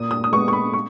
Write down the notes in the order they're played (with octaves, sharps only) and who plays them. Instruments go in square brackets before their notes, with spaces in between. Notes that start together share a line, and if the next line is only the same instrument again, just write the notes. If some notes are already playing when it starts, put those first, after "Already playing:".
Already playing: [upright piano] A#2 D#6
D#6
D#6
G#3 B3 C#6
C#6
B5
C#6